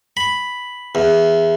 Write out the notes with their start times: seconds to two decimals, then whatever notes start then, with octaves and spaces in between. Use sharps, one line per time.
0.17 B5
0.95 E2